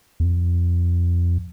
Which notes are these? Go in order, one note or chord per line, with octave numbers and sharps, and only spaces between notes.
E2
F2